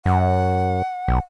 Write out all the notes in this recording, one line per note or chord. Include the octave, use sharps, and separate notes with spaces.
F#2 F#5
B1